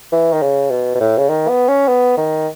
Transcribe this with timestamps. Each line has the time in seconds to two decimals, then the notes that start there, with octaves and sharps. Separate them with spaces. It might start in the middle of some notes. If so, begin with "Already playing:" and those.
0.12 E3
0.32 D#3
0.42 C#3
0.70 B2
0.95 B2
1.00 A2
1.17 C#3
1.29 D#3
1.49 B3
1.68 C#4
1.88 B3
2.17 D#3